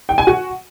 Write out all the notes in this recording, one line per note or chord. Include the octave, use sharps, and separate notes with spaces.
G5
G#5
F#4